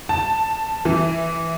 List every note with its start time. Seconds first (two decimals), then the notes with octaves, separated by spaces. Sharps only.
0.09 A5
0.85 E3